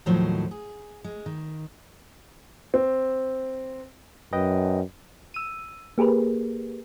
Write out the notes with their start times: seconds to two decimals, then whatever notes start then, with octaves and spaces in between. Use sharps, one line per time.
0.06 D#2 A2 D#3 F3 F#3 C5
0.51 G#4
1.04 G#3
1.26 D#3
2.74 C4
4.33 F#2 B4 D#5 G5
5.34 E6 D#7
5.98 A#3 G4 G#4 A#4 B4